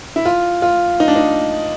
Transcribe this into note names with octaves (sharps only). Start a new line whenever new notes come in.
E4
F4
F4
D#4
D4
D#4